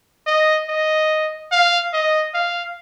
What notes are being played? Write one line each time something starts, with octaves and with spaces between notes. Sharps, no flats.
D#5
D#5
F5
D#5
F5